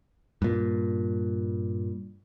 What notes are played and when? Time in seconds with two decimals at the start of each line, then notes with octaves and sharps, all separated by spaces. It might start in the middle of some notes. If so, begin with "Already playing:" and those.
0.42 G2 A#2